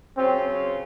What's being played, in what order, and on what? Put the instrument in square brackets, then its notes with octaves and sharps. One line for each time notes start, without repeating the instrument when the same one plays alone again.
[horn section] C#3 F#3 C#4 F4 G#4 [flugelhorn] C4